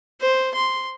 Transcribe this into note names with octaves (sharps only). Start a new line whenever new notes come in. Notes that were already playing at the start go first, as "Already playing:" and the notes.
C5
C6